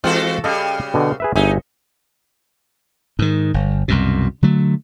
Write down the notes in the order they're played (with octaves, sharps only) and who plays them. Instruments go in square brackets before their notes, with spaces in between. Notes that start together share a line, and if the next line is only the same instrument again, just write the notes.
[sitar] E3 F#4 A4 [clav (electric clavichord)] G#3 C4 F4
[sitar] C#3 G3 [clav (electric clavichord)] A4 D#5 F5
[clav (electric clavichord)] B2 D3
G#4 B4 E5
[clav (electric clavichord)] G1 G#4 E5 [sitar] D#4
[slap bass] G#2 D#3
G1
C2 F#2 B2
D3 F#3 A3